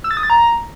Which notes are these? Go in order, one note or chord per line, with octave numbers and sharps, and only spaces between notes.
E6
A6
D#6
A6
A#5